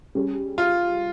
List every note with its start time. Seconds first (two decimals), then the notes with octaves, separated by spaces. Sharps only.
0.15 G3 C#4 G#4
0.58 F4